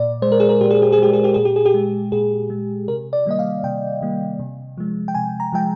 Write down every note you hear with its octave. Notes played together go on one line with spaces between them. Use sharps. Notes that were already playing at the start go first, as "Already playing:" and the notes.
Already playing: A#2 D5
G#3 C5
A#4
G#4
A#4
A#2 G4
G#4
G4
G#4
G#3 G4
G#4
G4
A#2 G#4
G4
G#4
G4
G#3
A#2 G#4
G#3
C3 A#4
D5
D#3 G3 A#3 D#5
F5
C3 G5
D#3 G3 A#3
C3
F3 G#3
G5
C3 G#5
A#5
F3 G#3 G5